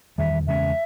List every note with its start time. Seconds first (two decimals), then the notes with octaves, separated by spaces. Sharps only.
0.18 E2 D#3 G3 E5
0.47 E2 C#3 G#3 C#4 E5